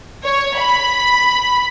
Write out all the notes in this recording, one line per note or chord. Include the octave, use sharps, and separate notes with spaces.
C#5
B5